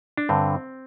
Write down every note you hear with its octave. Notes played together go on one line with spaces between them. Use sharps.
D4
G2 D3 C4